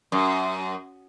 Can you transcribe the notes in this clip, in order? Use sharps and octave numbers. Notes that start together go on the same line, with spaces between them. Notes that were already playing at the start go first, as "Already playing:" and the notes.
F#2